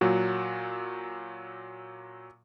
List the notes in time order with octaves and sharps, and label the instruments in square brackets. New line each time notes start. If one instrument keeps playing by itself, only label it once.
[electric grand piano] A#2 F#3 F#4